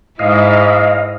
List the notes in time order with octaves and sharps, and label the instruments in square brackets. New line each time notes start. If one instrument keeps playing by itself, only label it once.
[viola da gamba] G#2 E4 [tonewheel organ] D#5 F5